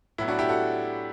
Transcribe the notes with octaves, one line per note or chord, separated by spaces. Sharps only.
A2 F#3 B3 E4
D4 F#4
E4 G4
F#4 A4